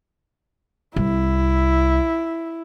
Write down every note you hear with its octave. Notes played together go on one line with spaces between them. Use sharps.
C2 E4